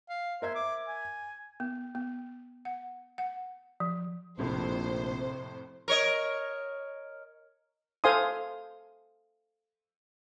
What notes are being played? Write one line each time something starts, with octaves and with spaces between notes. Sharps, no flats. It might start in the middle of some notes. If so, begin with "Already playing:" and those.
F5
A#4 C5 E5 G#6
D6
G#5
B3
B3
F#5
F#5
F3
A#1 F2 A2 C3 C5
A#4 C#5 D#5
A4 C5 F5 G#5 C6 D#6